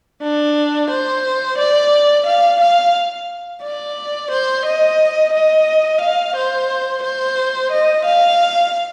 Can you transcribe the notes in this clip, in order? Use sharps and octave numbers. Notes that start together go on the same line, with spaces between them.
D4
C5
D5
F5
F5
D5
C5
D#5
D#5
F5
C5
C5
D#5
F5